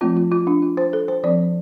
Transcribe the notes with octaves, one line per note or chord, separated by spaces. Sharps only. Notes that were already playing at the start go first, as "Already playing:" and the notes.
F3 A3 C4 F4
F4
F4
D4
F4
C5
A4
C5
F3 C4 D5